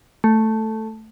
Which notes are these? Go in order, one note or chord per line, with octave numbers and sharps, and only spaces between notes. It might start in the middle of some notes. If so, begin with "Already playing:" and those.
A3